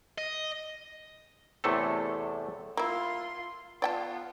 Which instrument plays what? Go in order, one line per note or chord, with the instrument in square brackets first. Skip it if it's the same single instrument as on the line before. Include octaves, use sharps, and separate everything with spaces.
[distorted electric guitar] D#5
[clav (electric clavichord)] E2 A2 C3 A3 A4
[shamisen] A#3 E4 [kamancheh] F4 C6
[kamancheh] B3 F4 [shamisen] D5 G5 A5